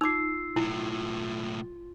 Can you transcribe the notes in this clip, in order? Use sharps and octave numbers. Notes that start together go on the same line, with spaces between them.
D#4 F4 D6 E6 C7
B1 A2 E4